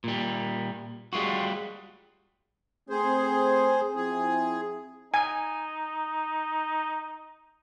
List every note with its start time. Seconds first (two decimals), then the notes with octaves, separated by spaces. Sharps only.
0.04 A#2 G3
1.13 G3 G#3 F4 F#4
2.90 A3 C4 G#4 C5
3.96 F3 C4 E4 G#4
5.14 D#4 G#5